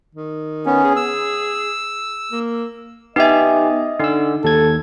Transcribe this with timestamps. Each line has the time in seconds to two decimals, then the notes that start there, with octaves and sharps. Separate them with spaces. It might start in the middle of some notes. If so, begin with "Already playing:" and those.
0.15 D#3
0.66 B3 C#4
0.84 G#4
0.96 E6
2.31 A#3
3.16 B3 D#4 G4 D#5 E5 G#5
4.00 D3 D#4 E6
4.44 D#2 A4 G#6